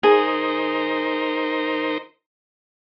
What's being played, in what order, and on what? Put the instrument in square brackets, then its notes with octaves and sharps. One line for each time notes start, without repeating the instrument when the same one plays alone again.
[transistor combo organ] D#4 A#4 C5 [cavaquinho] G#4